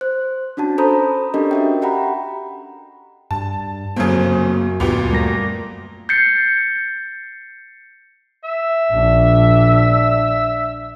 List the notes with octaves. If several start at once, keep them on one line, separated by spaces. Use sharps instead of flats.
C5 F#6
C#4 D4 F#4 A5
A4 C5 A#5 B5 D#6 G6
C#4 D4 G4 A4 A#4 D#5
F#4 E5 G5
G4 F#5 G5 A#5 B5
G2 A5
G1 F#2 C#3 A#3 C4
D2 A#2 B3 G4
G3 A3 A#3 A#6
G6 A6 C7 C#7
E5
A#1 D4